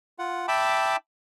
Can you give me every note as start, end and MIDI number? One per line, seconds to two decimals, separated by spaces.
0.19 0.46 65
0.19 0.46 78
0.48 0.96 76
0.48 0.96 79
0.48 0.96 81
0.48 0.96 83
0.48 0.96 86